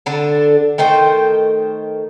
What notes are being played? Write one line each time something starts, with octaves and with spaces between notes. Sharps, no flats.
D3 D4 A4
D#3 A3 C5 G5